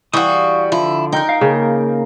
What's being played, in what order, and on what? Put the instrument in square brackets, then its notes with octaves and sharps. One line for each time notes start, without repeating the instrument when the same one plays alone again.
[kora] E3 [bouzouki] G3 F#4 [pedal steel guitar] F5 C#6 D#6
[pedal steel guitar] D3 [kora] F3 [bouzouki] E4
[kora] D#4 [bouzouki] A#4 G5
[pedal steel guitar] F5
[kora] C#3 [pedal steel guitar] A#3